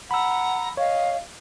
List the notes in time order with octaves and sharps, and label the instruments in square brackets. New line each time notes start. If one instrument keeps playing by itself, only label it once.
[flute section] F#5 A#5 [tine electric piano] B5 E6
[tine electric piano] C#5 [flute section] D#5 F5